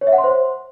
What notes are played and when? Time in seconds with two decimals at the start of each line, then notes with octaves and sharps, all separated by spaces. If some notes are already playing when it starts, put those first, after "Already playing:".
0.01 C#5
0.07 E5
0.13 F#5
0.18 C6
0.24 C5